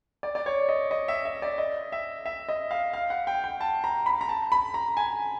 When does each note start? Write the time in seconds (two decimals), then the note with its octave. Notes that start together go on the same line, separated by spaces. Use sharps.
0.23 D5
0.35 D5
0.46 C#5
0.69 D#5
0.91 D#5
1.08 E5
1.25 E5
1.42 D5
1.58 D#5
1.92 E5
2.26 E5
2.49 D#5
2.71 F5
2.93 F5
3.10 F#5
3.27 G5
3.44 G5
3.61 A5
3.84 A#5
4.06 B5
4.21 A#5
4.29 A5
4.52 B5
4.74 A#5
4.97 G#5